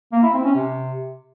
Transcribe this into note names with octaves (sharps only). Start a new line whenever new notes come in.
A#3
E4
C4
C#4
C3